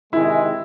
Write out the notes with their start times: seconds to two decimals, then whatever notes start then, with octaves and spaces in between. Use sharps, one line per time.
0.13 C3 D#3 G#3 E4